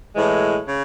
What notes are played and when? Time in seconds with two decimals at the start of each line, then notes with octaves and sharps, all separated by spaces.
0.13 A2 E3 G#3
0.67 C#3